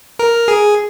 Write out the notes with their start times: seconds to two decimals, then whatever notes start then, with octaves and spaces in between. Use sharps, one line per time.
0.19 A#4
0.48 G#4